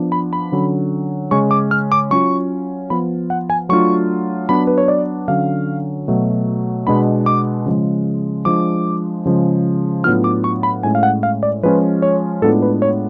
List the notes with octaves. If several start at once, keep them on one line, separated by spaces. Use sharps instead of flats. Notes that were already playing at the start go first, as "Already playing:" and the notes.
Already playing: F3 B3 D4
B5
B5
D3 F#3 C#4
C#3 G#3 C#4 C#6
D6
F6
D6
F#3 C#4 F4 C#6
F3 B3 F4 B5
F#5
G#5
F#3 A3 D4 F4 C#6
F#3 B3 D4 B5
B4
C#5
D5
D3 F#3 C#4 F5
B2 F#3 A3
B2 G#3 B3 D4 B5
D6
C#3 F3 G#3
F3 G#3 D4 D6
C#3 F3 G#3
A2 F#3 B3 D4 F4 F6
D6
C#6
B5
A2 G#3 C#4 G#5
F5
F#5
F5
D5
F3 G#3 C#4 F4 B4
C#5
A2 G#3 B3 D4 F4 A4
B4
C#5